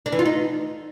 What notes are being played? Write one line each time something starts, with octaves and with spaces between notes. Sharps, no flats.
D4
E3
F4
D#4